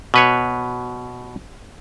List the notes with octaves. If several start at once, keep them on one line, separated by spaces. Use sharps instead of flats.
B2 B4 C#5